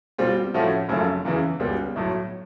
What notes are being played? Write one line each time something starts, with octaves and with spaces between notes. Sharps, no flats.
B2 G3 C4 F4
A2 F3 A3 C#4 F#4
G#1 F#2 C#3 F3 A3
E2 C#3 E3
C#2 B2 G3 B3
B1 A2 F#3